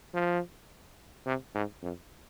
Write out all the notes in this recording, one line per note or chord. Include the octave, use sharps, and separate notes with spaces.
F3
C3
G#2
F2